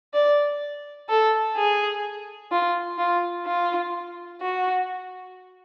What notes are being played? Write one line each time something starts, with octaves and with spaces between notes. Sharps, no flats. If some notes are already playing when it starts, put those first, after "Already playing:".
D5
A4
G#4
F4
F4
F4
F#4